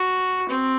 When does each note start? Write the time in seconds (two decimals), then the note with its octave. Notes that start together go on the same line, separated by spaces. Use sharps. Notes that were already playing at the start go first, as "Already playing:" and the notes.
Already playing: F#4
0.48 C4